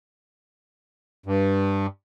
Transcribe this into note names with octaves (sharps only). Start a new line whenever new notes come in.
G2